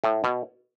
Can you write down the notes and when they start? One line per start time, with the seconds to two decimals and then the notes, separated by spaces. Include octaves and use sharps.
0.04 A2
0.24 B2